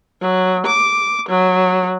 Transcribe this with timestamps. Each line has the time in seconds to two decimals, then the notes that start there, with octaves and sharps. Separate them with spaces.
0.21 F#3
0.66 D6
1.29 F#3